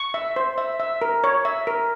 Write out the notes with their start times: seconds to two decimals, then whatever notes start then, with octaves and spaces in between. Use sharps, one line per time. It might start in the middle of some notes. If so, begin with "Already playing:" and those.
Already playing: C#6
0.14 E5
0.36 C5
0.58 E5
0.80 E5
1.02 A#4
1.24 C#5
1.45 E5
1.67 A#4